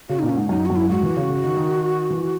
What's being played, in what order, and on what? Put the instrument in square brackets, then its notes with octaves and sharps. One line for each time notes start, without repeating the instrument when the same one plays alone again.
[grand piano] C#3 [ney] F#4
[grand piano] A#2 [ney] D#4
[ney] C#4
[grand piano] G#2 [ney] D#4
[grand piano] F#2 [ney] D#4
[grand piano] F#2 [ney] F#4
[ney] E4
[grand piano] G#2 [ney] F#4
[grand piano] E3
C#3
C#3
D#3
D#3
E3